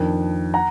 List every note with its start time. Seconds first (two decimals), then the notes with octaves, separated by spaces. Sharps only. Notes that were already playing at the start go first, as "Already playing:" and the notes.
Already playing: F2 D#3 A#3 D4
0.54 F#5 A#5